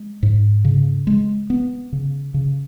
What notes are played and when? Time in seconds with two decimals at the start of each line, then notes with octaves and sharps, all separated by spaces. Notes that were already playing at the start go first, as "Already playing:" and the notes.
Already playing: G#3
0.23 G#2
0.65 C#3
1.07 G#3
1.50 B3
1.92 C#3
2.34 C#3